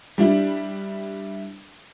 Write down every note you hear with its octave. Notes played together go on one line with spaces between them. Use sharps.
G3 D4 E4